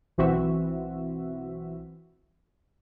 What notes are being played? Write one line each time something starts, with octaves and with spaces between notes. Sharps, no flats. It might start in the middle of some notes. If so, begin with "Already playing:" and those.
B1 E3 C4 F#4 E5